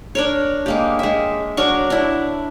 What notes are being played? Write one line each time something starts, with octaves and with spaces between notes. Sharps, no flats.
D4 A#4 C#5
G#3 A#3 G4
G#3 E5
F#3 D4 A#4 C#6
D4 E4